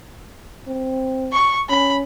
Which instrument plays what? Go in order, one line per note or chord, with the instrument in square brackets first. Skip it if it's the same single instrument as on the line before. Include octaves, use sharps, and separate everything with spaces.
[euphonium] C4
[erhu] C#6
[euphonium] C#4 [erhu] B5